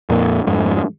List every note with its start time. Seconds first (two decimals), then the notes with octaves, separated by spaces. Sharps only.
0.10 F2 A#2 A#3
0.47 F2 G#2